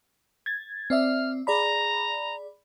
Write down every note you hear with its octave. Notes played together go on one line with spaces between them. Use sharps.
G#6 A6
C4 D5 E5 F6
G#4 D5 A#5 B5